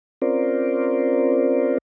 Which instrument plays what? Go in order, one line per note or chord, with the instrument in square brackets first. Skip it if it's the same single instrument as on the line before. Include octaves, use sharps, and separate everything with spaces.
[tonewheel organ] C4 C#4 F4 A#4 C5 D5